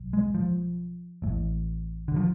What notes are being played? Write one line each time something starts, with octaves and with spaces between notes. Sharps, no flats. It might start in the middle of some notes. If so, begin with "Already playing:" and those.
Already playing: B1
G#3
F3
A1 A2
D3
F3